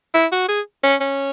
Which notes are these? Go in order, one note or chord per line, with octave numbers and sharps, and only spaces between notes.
E4
F#4
G#4
C#4
C#4